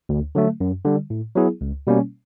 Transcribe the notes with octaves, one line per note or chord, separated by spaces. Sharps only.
D2
D3 F#3 A3
F#2
D3 G3
A2
F#3 B3 E4 G#4
C#2
B2 G3 A#3 C#4